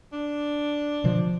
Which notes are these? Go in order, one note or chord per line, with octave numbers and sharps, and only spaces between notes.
D4
B2 D3 F3